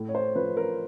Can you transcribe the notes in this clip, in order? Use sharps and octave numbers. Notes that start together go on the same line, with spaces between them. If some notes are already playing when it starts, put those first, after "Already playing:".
Already playing: A2
C#5
C5
F3 B4
A#4